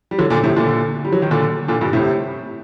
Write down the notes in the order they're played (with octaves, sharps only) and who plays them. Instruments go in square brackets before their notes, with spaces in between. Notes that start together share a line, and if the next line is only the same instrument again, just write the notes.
[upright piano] G3
D3 F#3
A#2 D3
A2 C3
A#2 D3
G3
F#3
D#3
A#2 D3
A#2 D3
G2 A#2
A2 C3